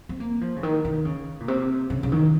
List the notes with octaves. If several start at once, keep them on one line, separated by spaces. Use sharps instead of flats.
C4
A#3
F3
C#3
D#3
D#3
C#3
A#2
C3
C#3
C#3
D#3